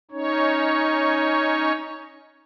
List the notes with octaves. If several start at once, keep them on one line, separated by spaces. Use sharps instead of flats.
C#4 D#4 C#5